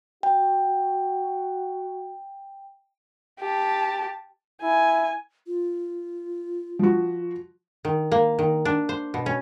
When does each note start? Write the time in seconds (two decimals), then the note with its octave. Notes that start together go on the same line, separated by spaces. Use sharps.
0.23 F#4 G5
3.40 G4 A5
4.62 E4 G#5
5.47 F4
6.79 F3 F#4
7.85 D#3
8.12 A#3
8.39 D#3
8.65 D4
8.89 C5
9.14 B2
9.26 C#4